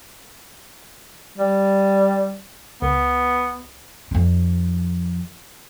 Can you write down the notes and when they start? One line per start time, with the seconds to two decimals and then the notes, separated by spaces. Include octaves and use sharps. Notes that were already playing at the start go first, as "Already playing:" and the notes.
1.38 G3
2.82 C#2 B3
4.11 F2 D#3